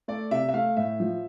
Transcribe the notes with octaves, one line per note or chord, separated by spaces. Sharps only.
A3 D5
C3 E5
E5
A3 F5
A2 E5
F3